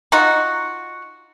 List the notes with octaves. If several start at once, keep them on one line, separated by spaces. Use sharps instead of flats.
D#4 F4 F#4